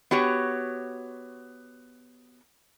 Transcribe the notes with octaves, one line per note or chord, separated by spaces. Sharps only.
B3 F#4 G4 C#5